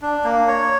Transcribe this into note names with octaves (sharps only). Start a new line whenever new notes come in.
D4
A#3
C#5